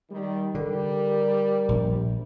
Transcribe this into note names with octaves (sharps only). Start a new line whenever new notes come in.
D#3 G3
D3 G3 A#4
A#1